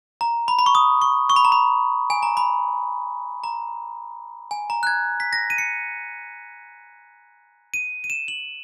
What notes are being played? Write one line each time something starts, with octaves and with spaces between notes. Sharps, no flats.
A#5
B5
B5
C#6
D#6
C#6
C#6
B5
A#5
B5
G#5
A#5
B5
A#5
G#5
A#5
F#6
G#6
B6
A#6
D#7
C#7
D#7
D#7
E7
F#7